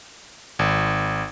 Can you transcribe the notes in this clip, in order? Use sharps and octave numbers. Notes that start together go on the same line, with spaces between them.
G#1